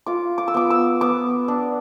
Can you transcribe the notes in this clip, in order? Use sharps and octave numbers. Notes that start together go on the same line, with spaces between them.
F4 D6
D6
E6
B3 D6
E6
B3 D6
D4